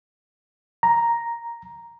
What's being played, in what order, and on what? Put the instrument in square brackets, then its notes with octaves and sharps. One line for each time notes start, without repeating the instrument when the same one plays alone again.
[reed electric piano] A#5